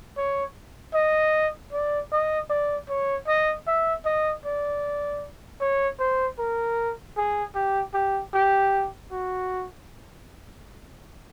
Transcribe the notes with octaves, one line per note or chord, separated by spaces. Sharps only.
C#5
D#5
D5
D#5
D5
C#5
D#5
E5
D#5
D5
C#5
C5
A#4
G#4
G4
G4
G4
F#4